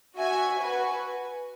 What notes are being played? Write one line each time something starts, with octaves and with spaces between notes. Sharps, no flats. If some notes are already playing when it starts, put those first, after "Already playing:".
F#4 E5 G#5
F#4 B4 G#5